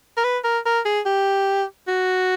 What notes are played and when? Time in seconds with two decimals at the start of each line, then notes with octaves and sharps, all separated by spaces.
0.17 A#4
0.24 B4
0.44 A#4
0.66 A#4
0.85 G#4
1.06 G4
1.88 F#4